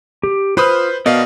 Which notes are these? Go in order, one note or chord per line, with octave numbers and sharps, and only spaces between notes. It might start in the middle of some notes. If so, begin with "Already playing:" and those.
G4
F4 B4 C5 B5 D#6 F6
B2 A#4 D5 D#5 F5